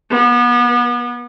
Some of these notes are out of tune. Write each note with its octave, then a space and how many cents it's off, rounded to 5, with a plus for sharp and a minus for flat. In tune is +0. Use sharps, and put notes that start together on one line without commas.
B3 -30